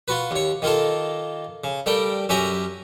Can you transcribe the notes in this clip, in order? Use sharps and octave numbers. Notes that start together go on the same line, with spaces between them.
F4 F#4 B4
D#2 C#5
D#3 A#3 F4 A4
C#3
G3 A3 A#4 G5
F#2 C#4 G4 E5 A#5